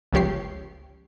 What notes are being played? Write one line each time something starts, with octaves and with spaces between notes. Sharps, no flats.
G1 C#2 F3 G4 C#5 C7